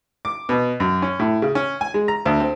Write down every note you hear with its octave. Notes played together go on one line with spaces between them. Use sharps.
D6
B2
F#2
C#4
A2
C#3
C#4
G#5
G#3
A#5
D2
C4